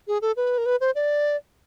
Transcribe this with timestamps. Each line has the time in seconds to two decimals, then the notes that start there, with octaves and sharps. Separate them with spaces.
0.08 G#4
0.22 A4
0.37 B4
0.58 A#4
0.66 B4
0.81 C5
0.95 D5